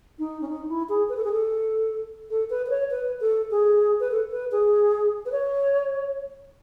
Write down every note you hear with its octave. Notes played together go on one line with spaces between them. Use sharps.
D#4
C#4
D#4
E4
G#4
B4
A4
G#4
A4
A4
B4
B4
C#5
B4
A4
G#4
B4
A4
B4
G#4
B4
C#5